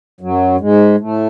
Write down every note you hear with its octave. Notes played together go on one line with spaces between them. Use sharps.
F#2 F#3
G#2 G#3
A2 A3